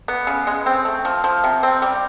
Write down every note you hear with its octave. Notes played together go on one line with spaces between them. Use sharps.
B3
C#3
G#3
C4
A3
F3
F3
C3
C4
G3